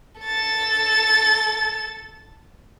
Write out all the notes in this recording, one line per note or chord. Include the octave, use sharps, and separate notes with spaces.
A4 A6